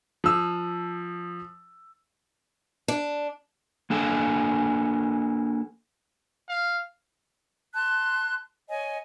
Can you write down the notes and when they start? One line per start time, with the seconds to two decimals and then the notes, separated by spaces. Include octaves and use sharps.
0.24 F3 E6
2.88 D4
3.90 A#3 D4 A4 G5 G#5
6.49 F5
7.74 A5 C6 F#6
8.69 C#5 D#5 G#5